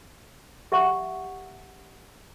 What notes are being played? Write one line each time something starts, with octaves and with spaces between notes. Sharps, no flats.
G4 E5 F#5 C#6